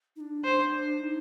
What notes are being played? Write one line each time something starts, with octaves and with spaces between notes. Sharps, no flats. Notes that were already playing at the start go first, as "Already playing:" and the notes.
D#4
D4
C5
D#4